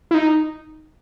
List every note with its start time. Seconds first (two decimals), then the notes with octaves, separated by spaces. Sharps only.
0.11 E4
0.14 D#4